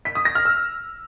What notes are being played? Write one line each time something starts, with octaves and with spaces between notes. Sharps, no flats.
B6
D#6
A#6
F6
E6